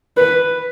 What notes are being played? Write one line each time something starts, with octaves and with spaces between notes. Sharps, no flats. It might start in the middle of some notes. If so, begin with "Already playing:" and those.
B4